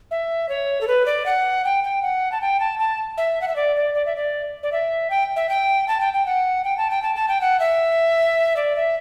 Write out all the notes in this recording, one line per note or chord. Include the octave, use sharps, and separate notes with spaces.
E5
C#5
A4
B4
D5
F#5
G5
G5
F#5
A5
G5
A5
A5
E5
F#5
E5
D5
D5
D5
E5
D5
D5
E5
G5
E5
G5
A5
G5
G5
F#5
G5
A5
G5
A5
A5
G5
F#5
E5
D5
E5